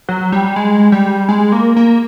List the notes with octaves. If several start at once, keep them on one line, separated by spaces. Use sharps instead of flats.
F#3
G3
G#3
G3
G#3
A#3
A#3